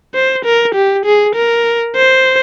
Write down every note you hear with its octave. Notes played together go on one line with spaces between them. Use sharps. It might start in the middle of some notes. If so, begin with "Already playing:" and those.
C5
A#4
G4
G#4
A#4
C5